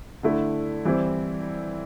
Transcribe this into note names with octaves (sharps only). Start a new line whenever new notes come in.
D3 A3 E4
E3 G3 C4 E4